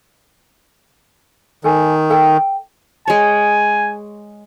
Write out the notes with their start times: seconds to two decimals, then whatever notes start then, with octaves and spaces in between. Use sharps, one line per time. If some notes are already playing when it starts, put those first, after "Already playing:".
1.64 D#3 A4 G#5
2.10 A4 G5
3.08 G#3 C#5 G#5